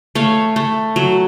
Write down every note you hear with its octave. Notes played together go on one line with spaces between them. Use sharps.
A3 C#5 F5
A3
F#3